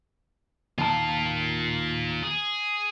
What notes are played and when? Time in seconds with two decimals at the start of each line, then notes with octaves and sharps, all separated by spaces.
0.78 D#2 F4 A#4 A5
2.23 G#4